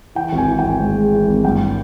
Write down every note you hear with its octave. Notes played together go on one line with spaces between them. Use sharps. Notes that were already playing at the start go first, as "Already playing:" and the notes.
E3 G5
G#1
G#5
E3
G#1 G5
G#2
G#3
E3
G#1
G2 G5